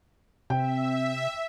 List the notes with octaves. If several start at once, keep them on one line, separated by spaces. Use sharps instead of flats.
C3 C4 E5 G5